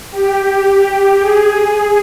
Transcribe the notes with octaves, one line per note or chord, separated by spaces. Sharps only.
G4
G4
G#4